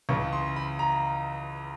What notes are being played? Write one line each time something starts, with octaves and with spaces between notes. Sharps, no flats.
C#2 C#3 E3 C#6
C6
B5
A#5